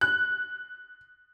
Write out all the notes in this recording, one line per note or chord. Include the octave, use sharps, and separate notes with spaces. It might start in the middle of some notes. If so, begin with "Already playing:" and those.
F#6